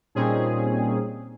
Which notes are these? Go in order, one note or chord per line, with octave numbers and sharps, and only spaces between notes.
A#2 G3 C4 C#4 D#4 G#4